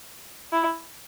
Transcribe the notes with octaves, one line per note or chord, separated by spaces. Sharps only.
E4